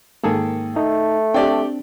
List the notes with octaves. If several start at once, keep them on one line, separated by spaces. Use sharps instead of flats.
G#2 D#3 A#3 G#4 A4
A3 D#4
C4 D4 G4 D5 G5